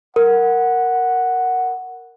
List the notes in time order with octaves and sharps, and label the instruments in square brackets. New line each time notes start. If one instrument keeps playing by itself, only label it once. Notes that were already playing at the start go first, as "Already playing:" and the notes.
[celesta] A#4 [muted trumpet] F#5